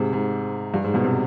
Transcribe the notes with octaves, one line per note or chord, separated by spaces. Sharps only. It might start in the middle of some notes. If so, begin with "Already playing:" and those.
Already playing: G#2 C3
G#2
G2
G#2
G2 B2
C3